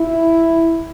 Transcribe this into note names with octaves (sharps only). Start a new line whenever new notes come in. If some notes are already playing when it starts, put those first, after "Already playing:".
Already playing: E4